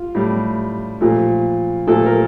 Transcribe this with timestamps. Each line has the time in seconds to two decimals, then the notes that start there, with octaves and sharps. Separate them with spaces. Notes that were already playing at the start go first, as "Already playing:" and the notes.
Already playing: F4
0.15 A2 G3
1.01 A#2 F3 A3
1.87 A#2 F3 A3 A4
2.06 A#4